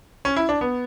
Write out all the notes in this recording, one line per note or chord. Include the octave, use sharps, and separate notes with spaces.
C#4
E4
D4
B3